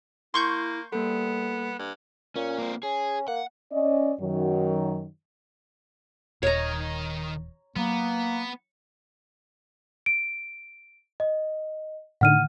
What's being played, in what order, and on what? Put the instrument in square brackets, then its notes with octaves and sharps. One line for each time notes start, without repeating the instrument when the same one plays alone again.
[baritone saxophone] A#3 [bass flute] E4 [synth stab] C6 C#6 G6
[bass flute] G3 [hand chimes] A#3 A4 [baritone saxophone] B3
[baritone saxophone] G2
[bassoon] A#2 [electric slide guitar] C#4
[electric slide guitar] A#3 C4
[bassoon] C#4 [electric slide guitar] G#4
[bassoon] A#3 [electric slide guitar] F#5
[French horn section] C#4 D5 D#5
F#2 D#3 F#3
[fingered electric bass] D#1 [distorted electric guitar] D#3 D#5 [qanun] C#5 A#5
[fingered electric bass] F#3 [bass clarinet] A#3 [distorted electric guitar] B3
[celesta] D7
D#5
[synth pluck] A2 D3 D#3 [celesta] F#5 F6 D#7